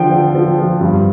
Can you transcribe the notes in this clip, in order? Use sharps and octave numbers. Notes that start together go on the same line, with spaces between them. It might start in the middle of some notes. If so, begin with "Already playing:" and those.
Already playing: D3 F3 G5
F3
F3
F3
G2